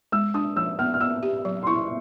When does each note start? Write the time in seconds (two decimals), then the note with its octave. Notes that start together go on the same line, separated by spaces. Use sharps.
0.12 G#3 E6
0.34 D4 D#6
0.56 F3 E6
0.79 B3 F6
0.94 F6
1.00 B3 E6
1.23 G4
1.45 F#3
1.63 C6
1.67 E4 C#6